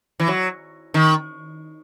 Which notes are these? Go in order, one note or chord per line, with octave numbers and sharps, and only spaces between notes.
E3
F#3
D#3